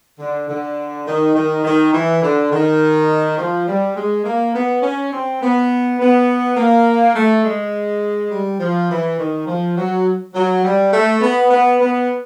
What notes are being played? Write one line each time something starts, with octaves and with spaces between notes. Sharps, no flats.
D3
D3
D#3
D#3
D#3
E3
D3
D#3
F3
G3
G#3
A#3
B3
C#4
C4
B3
B3
A#3
A3
G#3
G3
F3
E3
D#3
F3
F#3
F#3
G3
A3
B3
B3
B3